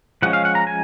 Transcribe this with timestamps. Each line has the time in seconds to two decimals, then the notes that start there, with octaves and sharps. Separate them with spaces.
0.22 F3 G#3 C#4 F#5
0.33 F5
0.45 F#5
0.55 A#5
0.67 G#5